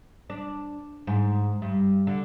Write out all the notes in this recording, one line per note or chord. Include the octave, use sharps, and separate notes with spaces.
D4
G#2
G2
D3